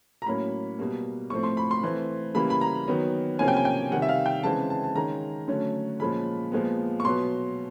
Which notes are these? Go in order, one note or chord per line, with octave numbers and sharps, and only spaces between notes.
A#5
A2 F#3 A#3 C#4 B5
B2 G3 A#3
A2 F3 A3 C4 C#6
C6
B5
C6
E3 A3 C4
C#3 E3 G3 A#3 B5
B5
A#5
D#3 F#3 B3
C3 F3 A#3 C#4 G#5
G5
G#5
G5
C3 D#3 G3 F#5
E5
F5
G5
C#3 E3 G#3 C4 A5
A5
A5
D#3 G#3 C#4 A#5
D3 F#3 A3 C#4
A#2 F3 G#3 C#4 B5
A#2 F3 G#3 B3
C#6
B2 F#3 B3 C6